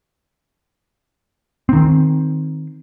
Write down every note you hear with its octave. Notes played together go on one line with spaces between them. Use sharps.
D#3 C4